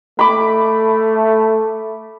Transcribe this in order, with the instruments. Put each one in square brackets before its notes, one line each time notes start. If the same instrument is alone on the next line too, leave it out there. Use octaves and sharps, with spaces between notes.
[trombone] A3 [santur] B5 D6